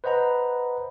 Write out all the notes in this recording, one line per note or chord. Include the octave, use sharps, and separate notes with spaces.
B4 C5 D#5 F#5 A#5 B5